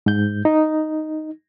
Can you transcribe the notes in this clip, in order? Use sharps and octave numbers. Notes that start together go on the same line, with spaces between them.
G#2 G6
D#4